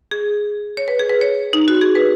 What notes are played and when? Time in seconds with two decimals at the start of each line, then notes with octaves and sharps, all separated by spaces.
0.11 G#4
0.77 C#5
0.88 B4
0.99 G#4
1.09 B4
1.21 C#5
1.53 D#4
1.68 F#4
1.81 G#4
1.95 B4